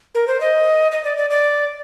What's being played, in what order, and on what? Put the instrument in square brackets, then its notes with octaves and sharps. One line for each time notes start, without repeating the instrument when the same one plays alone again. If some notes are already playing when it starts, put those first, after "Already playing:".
[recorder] A#4
C5
D#5
D#5
D5
D5
D5